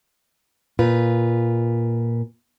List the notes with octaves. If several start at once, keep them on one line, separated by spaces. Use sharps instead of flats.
A#2 F4 B4